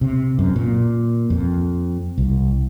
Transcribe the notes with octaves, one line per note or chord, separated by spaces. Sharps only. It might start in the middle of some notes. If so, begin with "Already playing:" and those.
C3
F#2
A#2
F2
C2